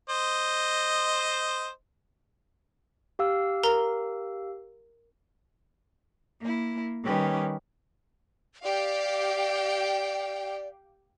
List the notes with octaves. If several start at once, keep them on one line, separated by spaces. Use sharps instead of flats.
C5 D#5
G4 F5 E6
A#4 A#5
A#3 E4
D#3 G3 C#4 G4 B4
G4 D5 F5 G5